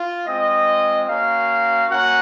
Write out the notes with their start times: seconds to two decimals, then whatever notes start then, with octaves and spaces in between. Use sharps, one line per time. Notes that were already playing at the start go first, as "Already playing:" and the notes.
Already playing: F4
0.26 G#3 C4 F4 D#5
1.08 A#3 C#4 F#4 F5
1.91 A#3 C#4 F#4 F#5